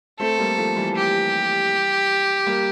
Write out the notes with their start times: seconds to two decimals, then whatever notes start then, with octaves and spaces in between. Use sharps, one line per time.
0.20 A3 C4 A4
0.38 G3 A#3
0.57 F3 A3
0.76 E3 G3
0.96 G4
2.47 G3 A#3